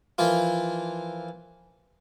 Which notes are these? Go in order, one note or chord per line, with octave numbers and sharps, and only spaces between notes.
E3 F3 A#3 F4